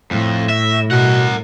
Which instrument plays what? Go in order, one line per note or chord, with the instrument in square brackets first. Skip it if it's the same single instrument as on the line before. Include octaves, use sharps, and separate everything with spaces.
[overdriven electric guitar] F2 [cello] A2
[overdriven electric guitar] E5
[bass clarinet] B2 [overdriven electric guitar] A#4 F#5